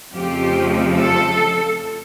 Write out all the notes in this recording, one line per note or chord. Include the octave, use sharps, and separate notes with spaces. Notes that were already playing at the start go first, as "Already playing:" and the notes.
F2 C#3 F3 A3 G4
A4